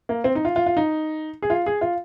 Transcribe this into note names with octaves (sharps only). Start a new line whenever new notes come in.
A#3
C4
D#4
F4
F4
F4
D#4
G#4
F4
G#4
F4